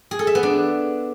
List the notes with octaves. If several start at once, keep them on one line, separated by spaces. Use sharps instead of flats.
G#4
A4
E5
B3
D4